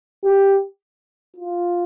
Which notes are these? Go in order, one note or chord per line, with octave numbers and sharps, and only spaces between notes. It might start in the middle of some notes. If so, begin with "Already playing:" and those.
G4
F4